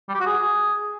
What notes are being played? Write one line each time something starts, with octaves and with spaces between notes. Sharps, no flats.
G3
G4
F#4
G#4